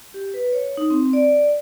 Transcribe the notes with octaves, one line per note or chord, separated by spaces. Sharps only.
G4
B4
C#5
D#4
C4
D5